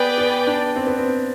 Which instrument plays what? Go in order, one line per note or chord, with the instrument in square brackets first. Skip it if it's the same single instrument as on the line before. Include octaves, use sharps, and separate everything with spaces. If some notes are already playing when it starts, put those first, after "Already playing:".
Already playing: [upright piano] B3 [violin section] G#4 B4 D5 G5
[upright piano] B3
D4
C4
B3
C4